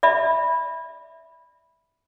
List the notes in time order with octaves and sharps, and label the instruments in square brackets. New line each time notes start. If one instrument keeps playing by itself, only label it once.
[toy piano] D5 E5 B5